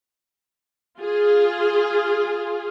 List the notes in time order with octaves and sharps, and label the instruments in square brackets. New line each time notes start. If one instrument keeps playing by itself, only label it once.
[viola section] F4 G#4